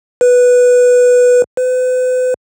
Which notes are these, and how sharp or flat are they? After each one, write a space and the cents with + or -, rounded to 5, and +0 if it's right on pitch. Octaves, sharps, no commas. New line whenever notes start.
B4 -5
B4 +40